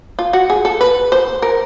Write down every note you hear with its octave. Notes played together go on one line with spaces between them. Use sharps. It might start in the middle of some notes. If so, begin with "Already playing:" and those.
F4
F#4
G#4
A4
B4
C5
A#4